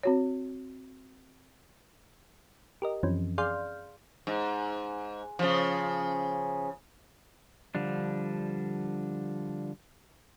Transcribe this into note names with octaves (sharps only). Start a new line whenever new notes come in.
C4 F#4 C#5
G4 A#4 D#5
F#2 E3 F3 C4 C#4
G#4 D5 F5 C6 F6 G6
G#2
C#3 F3
D3 F3 G3 D4